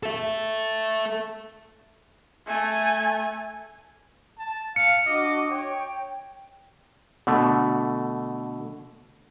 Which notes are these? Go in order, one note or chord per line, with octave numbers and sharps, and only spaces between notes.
A4 E5
A3 G#5
A5
F5 C#7
D4 F#4 D#5 D6
C#5 G5
B2 D3 A3